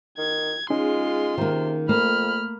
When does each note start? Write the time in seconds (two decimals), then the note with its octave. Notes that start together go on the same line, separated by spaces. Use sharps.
0.18 D#3 G#6
0.70 G#3 C#4 D#4 F4 G#4 C6
1.38 C3 D#3 A#3
1.89 F2 A3 A#3 B5 F6